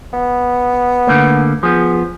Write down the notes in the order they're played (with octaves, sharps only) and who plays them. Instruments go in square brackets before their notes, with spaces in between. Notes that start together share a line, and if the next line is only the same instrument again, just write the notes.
[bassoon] B3
[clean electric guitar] D3 A3 A#3
[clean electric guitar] F3 B3 [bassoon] G#4